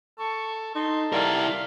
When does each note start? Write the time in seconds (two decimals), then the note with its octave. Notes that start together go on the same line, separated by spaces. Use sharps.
0.18 A4 C#6
0.75 D#4 A4 C6
1.13 G3 E4 A#4 F5